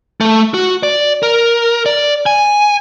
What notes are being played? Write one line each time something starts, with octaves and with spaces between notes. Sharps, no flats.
A3
F#4
D5
A#4
D5
G#5